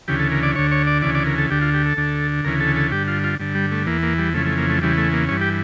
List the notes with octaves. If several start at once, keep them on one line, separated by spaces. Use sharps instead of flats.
D2 C#3 E3 G4
A4
A#4
D5
D2 D3 C#5
C#5
D5
D2 C#3 E3 D5
D5
A#4
A4
D2 D3 G4
F4
G4
A4
D2 D3
D2 C#3 E3 A#4
A4
A4
G2 D3 G4
F4
F4
G2 D3
G3
A3
E2 E3 A#3
A#3
G3
F2 C#3 E3 A3
A3
A#3
A3
E2 C#3 E3 G3
A3
A#3
G2 E3 C#4
G4